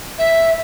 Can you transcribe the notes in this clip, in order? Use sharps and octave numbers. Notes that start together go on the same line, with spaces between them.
E5